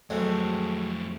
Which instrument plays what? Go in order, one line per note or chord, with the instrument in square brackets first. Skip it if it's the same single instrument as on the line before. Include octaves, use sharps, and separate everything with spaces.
[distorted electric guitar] F2 G#4 [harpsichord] F#3 G#3 C4 [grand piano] A3